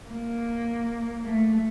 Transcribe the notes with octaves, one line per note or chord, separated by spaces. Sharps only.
A#3
A3